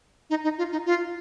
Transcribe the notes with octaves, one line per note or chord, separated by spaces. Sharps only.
D#4
D#4
F4
D#4
F4